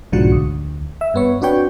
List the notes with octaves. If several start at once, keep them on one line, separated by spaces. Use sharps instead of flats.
B1 G#2 D3 F3 F#4 C#7
D2
E5
G2 B3 C#5
C4 D4 F#4 B4 C#5 G5